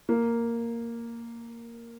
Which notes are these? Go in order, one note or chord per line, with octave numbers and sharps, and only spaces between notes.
A#3